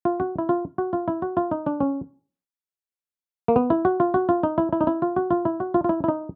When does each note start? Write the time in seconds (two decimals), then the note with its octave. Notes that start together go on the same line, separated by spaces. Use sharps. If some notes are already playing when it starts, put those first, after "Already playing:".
0.05 F4
0.20 F#4
0.39 E4
0.49 F4
0.78 F#4
0.93 F4
1.08 E4
1.22 F#4
1.37 F4
1.51 D#4
1.66 D4
1.80 C#4
3.48 A#3
3.56 B3
3.70 E4
3.85 F#4
4.00 F4
4.14 F#4
4.29 F4
4.43 D#4
4.58 E4
4.73 E4
4.81 D#4
4.87 E4
5.02 F4
5.16 F#4
5.31 F4
5.45 E4
5.60 F#4
5.74 F4
5.84 F4
5.89 E4
6.04 E4
6.08 D#4